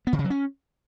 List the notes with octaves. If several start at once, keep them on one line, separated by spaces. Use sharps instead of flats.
B3
D3
C#3
F#3
C#4